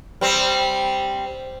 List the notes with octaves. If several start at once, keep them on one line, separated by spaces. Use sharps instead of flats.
G3 C4